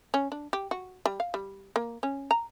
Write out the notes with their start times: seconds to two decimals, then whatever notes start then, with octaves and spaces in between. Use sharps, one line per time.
0.14 C#4
0.32 D4
0.53 G4
0.71 F#4
1.06 G3
1.20 F5
1.34 G3
1.76 A#3
2.03 C#4
2.31 A#5